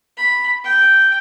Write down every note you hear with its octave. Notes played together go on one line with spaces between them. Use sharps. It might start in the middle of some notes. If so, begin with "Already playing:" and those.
B5
G5